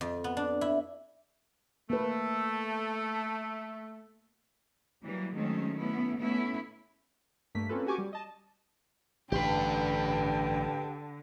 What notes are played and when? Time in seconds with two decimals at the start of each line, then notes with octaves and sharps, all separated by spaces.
0.01 F2
0.24 B3
0.37 D4
0.61 E4
1.90 A3 A#3 B4
5.03 E3 F#3 G3 A#3
5.35 D#3 F#3 G#3 A3 C4 C#4
5.78 A3 B3 C#4 E4
6.18 A3 B3 C#4 E4
7.55 G2 A3 A#3 B6
7.69 A#3 C4 C#4 F4 A4 B4
7.86 F#4 G4 G#5 C#6 D6
7.98 G3
8.13 D#5 A5
9.32 A1 G2 D3 G4 B4 G5